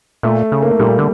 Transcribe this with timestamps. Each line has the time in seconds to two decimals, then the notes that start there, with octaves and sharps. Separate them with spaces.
0.23 A#2 A3
0.52 C#3
0.63 A#3
0.71 A3
0.79 A#2 G3
0.99 D3